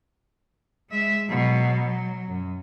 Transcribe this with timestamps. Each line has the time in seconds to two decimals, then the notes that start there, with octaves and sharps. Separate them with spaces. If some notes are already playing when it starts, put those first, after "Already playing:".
0.90 G#3 E5
1.29 B2 F#3
1.87 F#3
2.28 F#2